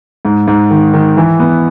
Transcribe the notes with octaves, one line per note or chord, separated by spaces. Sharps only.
G#2
G#2
D#3
D#3
E3
B3